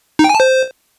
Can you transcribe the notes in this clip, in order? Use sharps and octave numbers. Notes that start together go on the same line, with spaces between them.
D#4
G5
G#5
A5
C5